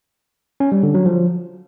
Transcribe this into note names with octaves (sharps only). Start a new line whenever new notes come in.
C#4
G3
D3
F#3
F3